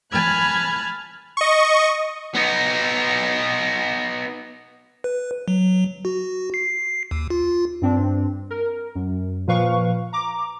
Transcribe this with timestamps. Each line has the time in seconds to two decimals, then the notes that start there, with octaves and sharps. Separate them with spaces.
0.11 G#5 A5 B5 F6 F#6 G#6
1.37 D#5 C#6
2.35 B3 D#4
5.04 B4
5.48 F#3
6.05 F#4
6.54 C7
7.11 D#2
7.30 F4
7.82 G2 C4 D4
8.51 A#4
8.95 F#2
9.47 A#2 F3 B4 F5 C#6
10.13 A#5 D6